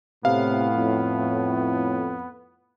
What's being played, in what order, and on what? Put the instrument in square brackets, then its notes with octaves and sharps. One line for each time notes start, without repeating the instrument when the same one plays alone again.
[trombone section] A2 [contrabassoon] C3 [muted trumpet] B3 [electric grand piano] F5
[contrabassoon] F2